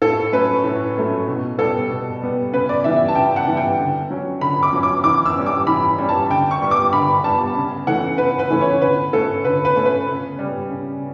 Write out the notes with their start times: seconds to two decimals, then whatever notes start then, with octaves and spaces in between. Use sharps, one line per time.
0.02 A2 A4
0.32 F#3 A3 C#4 B4
0.64 A2
0.96 F#3 A3 C#4
1.27 B2
1.58 G3 B3 A4
1.90 B2
2.22 G3 B3
2.52 C#3 B4
2.69 D5
2.84 E3 G3 B3 E5
3.08 A5
3.15 C#3 G5
3.36 F#5
3.47 E3 G3 B3
3.57 G5
3.78 D3
4.10 F#3 C#4
4.41 D3 B5
4.63 D6
4.73 F#3 C#4
4.83 D6
5.04 E3 D6
5.26 E6
5.36 G3 C#4
5.46 D6
5.67 E3 B5
5.98 G3 C#4
6.09 A5
6.30 D3 G5
6.51 C#6
6.62 G3 B3
6.71 D6
6.93 D3 B5
7.24 G3 B3 A5
7.56 C#3
7.87 E3 A3 C#4 F#5
8.18 C#3 B4
8.39 B4
8.50 E3 A3 C#4
8.61 C#5
8.81 D3 B4
9.13 A3 C#4 A4
9.44 D3 B4
9.65 B4
9.75 A3 C#4
9.85 B4
10.07 C#3
10.39 G3 C#4
10.70 C#3